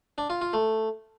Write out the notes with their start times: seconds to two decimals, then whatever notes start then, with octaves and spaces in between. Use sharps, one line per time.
0.18 D4
0.30 F4
0.42 F4
0.53 A3